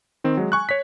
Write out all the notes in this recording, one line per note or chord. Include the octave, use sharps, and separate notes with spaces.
D#3 C4
F#3 G#3
G#5 C#6 F#6
C#5 B6